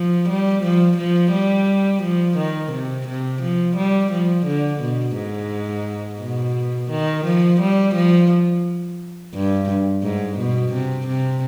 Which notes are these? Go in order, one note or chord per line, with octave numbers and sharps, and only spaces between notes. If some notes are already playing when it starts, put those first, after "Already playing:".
Already playing: F3
G3
F3
F3
G3
F3
D#3
C3
C3
F3
G3
F3
D3
B2
G#2
B2
D#3
F3
G3
F3
G2
G#2
B2
C3
C3